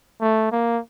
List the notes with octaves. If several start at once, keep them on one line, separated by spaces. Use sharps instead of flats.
A3
A#3